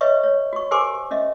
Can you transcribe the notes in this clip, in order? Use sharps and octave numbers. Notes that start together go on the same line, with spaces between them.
B4 C#5 D#5 E5 C#6
C#5
F#4 C#6
G4 A#4 C5 G#5 C6 D6
C#4 D#5 E5